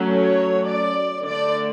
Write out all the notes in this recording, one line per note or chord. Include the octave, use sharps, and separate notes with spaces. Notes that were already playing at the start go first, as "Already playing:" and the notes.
Already playing: F#3 A3 C#4
C#5
D5
D3 A3 D4 D5